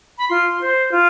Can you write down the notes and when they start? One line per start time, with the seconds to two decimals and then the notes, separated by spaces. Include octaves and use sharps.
0.18 B5
0.28 F4 C6
0.59 C5
0.89 F4